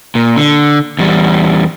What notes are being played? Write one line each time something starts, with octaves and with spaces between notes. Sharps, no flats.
A#2
D3
E2 G3